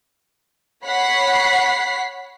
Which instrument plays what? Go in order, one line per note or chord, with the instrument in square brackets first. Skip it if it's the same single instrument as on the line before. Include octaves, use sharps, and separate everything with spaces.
[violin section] C#5 F#5 B5 B6 C7